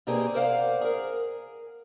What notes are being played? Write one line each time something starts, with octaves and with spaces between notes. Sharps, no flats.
B2 A#3 C4 G4 G#4 D5
A#4 C5 D5 D#5 F5 F#5
G#4 A#4